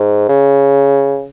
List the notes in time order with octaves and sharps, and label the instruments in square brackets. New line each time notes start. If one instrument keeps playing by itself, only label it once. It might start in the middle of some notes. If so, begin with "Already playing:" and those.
Already playing: [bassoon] G#2
C#3